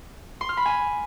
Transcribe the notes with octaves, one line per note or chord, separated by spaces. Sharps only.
C6
F6
B5
G#5